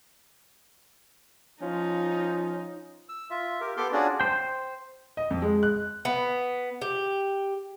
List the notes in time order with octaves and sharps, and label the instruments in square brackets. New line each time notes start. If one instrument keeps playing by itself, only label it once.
[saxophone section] F3 C#4 F4 [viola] D#4
[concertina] E6
F4 E5
G4 A#4
B3 G4 A4 C6 D6
C#4 D4 F4 F#4 G#4 D5
[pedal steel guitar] C5 G5
[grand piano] D#5
F2
G#3
F#6
[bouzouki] B3
G4